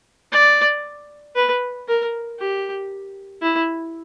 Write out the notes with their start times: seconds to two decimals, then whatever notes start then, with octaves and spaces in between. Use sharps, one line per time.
0.32 D5
1.35 B4
1.88 A#4
2.40 G4
3.42 E4